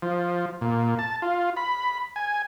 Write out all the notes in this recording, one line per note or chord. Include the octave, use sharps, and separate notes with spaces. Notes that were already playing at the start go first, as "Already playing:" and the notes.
F3
A#2
A5
F4
B5
G#5